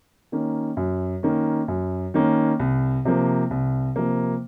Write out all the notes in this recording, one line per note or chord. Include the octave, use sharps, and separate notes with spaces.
D#3 A#3 C#4
F#2
D#3 A#3 C#4
F#2
D#3 A#3 C#4
C2
C3 F3 A#3
C2
C3 F3 A#3